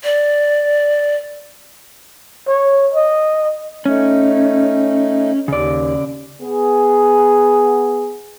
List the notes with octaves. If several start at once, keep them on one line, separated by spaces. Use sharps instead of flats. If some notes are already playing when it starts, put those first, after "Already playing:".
D5
C#5
D#5
A3 C#4 D#4
D#2 C#3 D5
B3 G#4